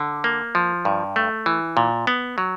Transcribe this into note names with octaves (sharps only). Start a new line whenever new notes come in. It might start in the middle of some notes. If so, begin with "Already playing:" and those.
Already playing: D3
A#3
F3
G2
A3
E3
A#2
B3
F#3